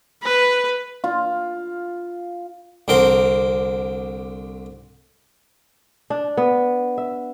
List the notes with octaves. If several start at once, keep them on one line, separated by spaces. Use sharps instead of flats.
B4
F4
C2 D3 C4 A#4 C6
D4
B3
E5